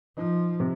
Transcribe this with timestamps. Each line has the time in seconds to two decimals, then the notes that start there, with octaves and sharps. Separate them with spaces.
0.17 F3 D#4
0.60 C3